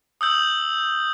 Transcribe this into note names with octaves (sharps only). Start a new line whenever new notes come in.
D#6 E6 G6 F#7